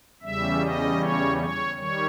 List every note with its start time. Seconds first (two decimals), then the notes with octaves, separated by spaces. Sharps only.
0.22 E2 C#3 G3 E5
0.61 D#5
1.00 C#5
1.37 C#5
1.76 D#3 G3 C#5